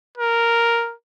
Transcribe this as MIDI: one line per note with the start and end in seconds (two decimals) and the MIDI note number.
0.18 0.94 70